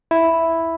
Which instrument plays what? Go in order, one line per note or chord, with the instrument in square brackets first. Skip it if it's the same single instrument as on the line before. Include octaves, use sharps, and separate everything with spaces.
[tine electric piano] E4